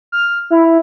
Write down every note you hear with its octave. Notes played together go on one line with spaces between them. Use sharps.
F6
E4